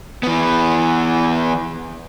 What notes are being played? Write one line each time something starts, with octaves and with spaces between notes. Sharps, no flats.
E3 B3